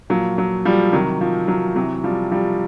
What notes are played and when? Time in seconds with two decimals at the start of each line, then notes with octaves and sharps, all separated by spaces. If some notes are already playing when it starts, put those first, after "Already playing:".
0.10 A#2 F3 F#3
0.38 F#3
0.65 F3 G3
0.93 C3 D#3 F#3
1.21 F3
1.48 F#3
1.76 C3 E3 F#3
2.04 F3 G3
2.32 F3 G3